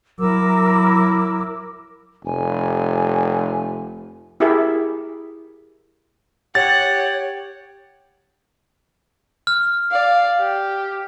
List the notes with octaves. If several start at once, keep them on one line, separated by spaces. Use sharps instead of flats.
F#3 E4 A#4 D6 E6
F1 G#5
E4 G4 G#4 A#4 E5
G4 C#5 F#5 A6
F6
D5 F5
G4